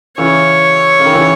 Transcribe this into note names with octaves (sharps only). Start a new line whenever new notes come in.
C#3 E3 C#5
C#3
D#3
C#3 E3